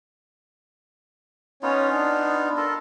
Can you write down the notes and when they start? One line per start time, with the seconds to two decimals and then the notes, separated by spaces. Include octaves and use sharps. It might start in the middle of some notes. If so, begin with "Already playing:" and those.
1.63 B3 C#4 D#4 F4 C#5
1.91 D4
2.57 F4 A4 A#4